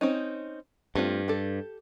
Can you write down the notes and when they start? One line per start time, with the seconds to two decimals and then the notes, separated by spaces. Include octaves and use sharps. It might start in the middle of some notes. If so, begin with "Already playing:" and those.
0.01 C4 C#4 D#4
0.95 G2 A3 C4 F4
1.28 G4 A4